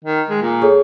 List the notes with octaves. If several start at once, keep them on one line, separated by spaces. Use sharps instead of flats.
D#3
G#3
A#2
G#4 A4 C#5